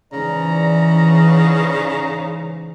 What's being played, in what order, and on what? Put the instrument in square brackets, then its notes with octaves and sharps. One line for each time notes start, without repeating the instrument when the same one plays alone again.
[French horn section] G#2 C#4 D5 [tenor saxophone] C#3 [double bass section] E3 [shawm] A#5